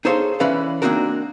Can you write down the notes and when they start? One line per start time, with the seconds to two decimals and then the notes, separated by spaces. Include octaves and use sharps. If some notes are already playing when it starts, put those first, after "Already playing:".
0.05 D#4 G#4 A4 C5 C#5 F5
0.40 E3 C#4 B4 D5 F5
0.82 A#3 C4 D4 D#4 F#4 A#4